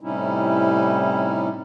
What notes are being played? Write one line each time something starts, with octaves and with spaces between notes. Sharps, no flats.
A2 C3 G3 C#4 D#4 E4